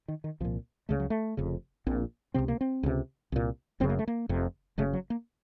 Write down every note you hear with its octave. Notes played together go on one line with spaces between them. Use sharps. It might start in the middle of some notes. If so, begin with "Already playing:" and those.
D#3
D#3
C2 A#2 F3
C#2 C#3 A3
F#3
A3
F1 F2 C#3
A#1 A#2 C4
C#2 C3 C4
A#3
C4
C#2 C3
C2 A#2
F#1 F#2 C#3 C4
A#3
A3
A#3
F1 F2 C3
F#1 F#2 C#3 A3
F#3
A#3